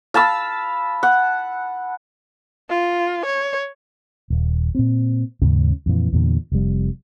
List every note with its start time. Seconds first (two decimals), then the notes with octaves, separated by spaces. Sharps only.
0.14 F5 A5 B5 E6
1.03 F#5
2.69 F4
3.25 C#5
4.30 D#1
4.75 A#2 C4
5.42 D#2 G#2 C#3 C#4
5.86 F2 A#2 E3
6.13 E2 A#2 D3
6.52 F1 F2 G3